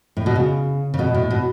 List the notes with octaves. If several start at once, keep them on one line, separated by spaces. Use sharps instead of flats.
A2
B2
C#3
C#3
B2
A2
B2